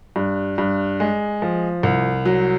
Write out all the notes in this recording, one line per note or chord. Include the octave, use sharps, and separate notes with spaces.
G2
G2
G#3
F3
C2
F#3